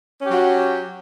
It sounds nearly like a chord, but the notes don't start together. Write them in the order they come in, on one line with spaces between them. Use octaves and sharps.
C#4 G4 F#3 F#4